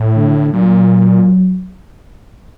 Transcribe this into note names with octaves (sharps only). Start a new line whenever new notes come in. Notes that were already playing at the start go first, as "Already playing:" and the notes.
Already playing: A2
D3
A#2 F#3